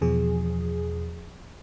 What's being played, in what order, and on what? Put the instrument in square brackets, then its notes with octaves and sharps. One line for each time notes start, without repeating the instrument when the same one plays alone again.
[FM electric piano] E2 B2 F3 G#4